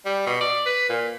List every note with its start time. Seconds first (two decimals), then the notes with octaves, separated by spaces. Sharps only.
0.06 G3
0.26 B2
0.41 D5
0.66 B4
0.90 A#2